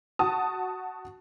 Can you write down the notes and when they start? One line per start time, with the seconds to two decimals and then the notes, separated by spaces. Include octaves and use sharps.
0.19 F#4 A5 D#6